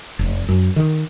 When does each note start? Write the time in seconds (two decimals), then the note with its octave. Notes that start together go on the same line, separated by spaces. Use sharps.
0.19 F1
0.49 F#2
0.76 D#3